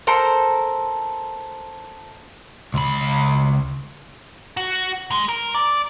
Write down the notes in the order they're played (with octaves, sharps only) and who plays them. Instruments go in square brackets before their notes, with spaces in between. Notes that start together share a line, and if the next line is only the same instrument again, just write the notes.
[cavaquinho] A4 A#4 C5
[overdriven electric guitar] C#2 B5
[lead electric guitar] F#4
G#3
A#4
D5